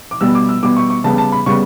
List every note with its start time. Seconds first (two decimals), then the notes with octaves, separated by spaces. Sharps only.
0.11 D6
0.21 B2 G3 B3 E6
0.35 D6
0.49 E6
0.63 B2 G3 B3 D6
0.77 C#6
0.90 C#6
1.04 C#3 G3 B3 A5
1.18 A5
1.32 B5
1.46 C#3 G3 B3 C#6